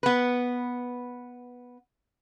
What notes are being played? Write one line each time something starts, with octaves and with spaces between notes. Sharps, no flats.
B3 B4